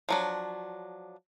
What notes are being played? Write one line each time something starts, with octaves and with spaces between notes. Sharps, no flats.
F3 F#3 D4